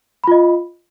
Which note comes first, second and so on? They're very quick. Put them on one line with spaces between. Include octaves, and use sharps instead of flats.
B5 F4 D#5